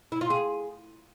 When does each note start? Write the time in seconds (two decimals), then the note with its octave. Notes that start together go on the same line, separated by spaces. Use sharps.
0.12 E4
0.21 F4
0.30 G#4